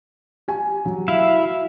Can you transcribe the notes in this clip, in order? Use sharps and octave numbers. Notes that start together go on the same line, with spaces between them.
G4 G#5
F#3
E4 E5 F5